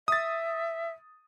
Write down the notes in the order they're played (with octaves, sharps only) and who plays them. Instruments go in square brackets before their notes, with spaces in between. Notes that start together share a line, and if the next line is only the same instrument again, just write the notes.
[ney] E5 [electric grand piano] D#6 A6